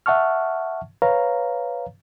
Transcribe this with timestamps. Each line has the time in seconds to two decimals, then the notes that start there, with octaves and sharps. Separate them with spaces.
0.06 E5 F#5 A5 C#6 F6
1.02 B4 C#5 F5 A#5